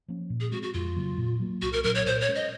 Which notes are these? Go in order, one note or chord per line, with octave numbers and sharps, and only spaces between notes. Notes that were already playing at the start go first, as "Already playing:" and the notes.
F3 A#3 C#4
A#2
G#4
G#3 C4 F#4
F#4
F2 F4
C#3 F#3 A#3
A#2
F#3 A#3
C2 F#4
A#4
A#2 F#3 C#4 A#4
C#5
A#2 C5
C#5
G#3 C#4
D#5